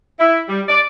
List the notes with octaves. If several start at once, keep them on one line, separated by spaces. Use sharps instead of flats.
E4
G3
D5